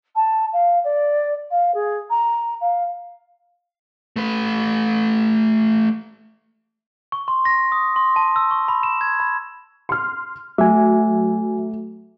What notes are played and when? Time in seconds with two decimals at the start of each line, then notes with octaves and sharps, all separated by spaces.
0.15 A5
0.53 F5
0.84 D5
1.51 F5
1.74 G#4
2.10 A#5
2.61 F5
4.16 A3 B4
7.12 C#6
7.28 C6
7.45 A#6
7.72 D#6
7.96 C6
8.16 A5
8.36 E6
8.51 C#6
8.68 B5
8.83 E7
9.01 G#6
9.20 B5
9.89 C6 F6
10.58 F#3 A3 E5 G#5